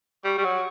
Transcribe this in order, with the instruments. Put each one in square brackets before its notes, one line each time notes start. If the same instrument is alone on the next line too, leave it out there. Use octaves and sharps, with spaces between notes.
[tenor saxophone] G3 [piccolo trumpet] C#6
[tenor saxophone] G3
F#3